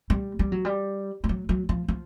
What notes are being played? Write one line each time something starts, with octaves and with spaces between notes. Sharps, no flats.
G3
G3
F#3
G3
G3
F#3
F#3
F3
F3